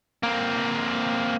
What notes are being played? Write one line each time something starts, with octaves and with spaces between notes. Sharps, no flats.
A#3 C4